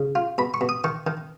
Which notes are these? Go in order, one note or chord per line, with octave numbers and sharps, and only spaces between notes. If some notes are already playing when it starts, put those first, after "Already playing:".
Already playing: C#3
F4
B2 B5
C#6
B2
D#6
D#3 C#6
D#3